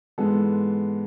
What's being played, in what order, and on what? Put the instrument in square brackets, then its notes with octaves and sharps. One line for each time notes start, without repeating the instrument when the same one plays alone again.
[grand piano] G#2 E3 G#3 B3 A4